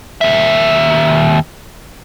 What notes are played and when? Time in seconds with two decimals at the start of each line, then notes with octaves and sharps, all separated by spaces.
0.21 D#2 E5